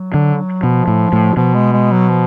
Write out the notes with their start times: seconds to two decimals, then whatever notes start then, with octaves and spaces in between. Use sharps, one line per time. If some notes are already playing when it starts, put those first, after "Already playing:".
Already playing: F#3
0.14 D3
0.63 B2 F3
0.88 A2
1.13 A2
1.37 B2 F3
1.55 G#3
1.73 G#3
1.92 F#3
2.09 F3